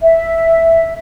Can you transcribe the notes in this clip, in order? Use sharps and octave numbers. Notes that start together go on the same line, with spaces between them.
E5